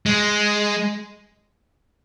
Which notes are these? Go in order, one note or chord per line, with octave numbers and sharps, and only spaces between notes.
G#3